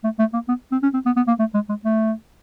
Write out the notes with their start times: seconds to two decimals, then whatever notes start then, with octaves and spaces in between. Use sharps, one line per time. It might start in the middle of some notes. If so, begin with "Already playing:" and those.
0.04 A3
0.19 A3
0.34 A#3
0.49 B3
0.72 C4
0.83 C#4
0.94 C4
1.06 B3
1.17 B3
1.28 A#3
1.39 A3
1.54 G#3
1.69 G#3
1.85 A3